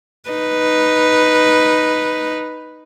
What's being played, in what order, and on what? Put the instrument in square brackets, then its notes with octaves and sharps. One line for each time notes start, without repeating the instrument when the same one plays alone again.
[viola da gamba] D#4 B4